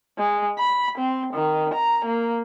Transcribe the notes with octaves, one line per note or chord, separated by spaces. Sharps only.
G#3
B5
C4
D#3
A#5
A#3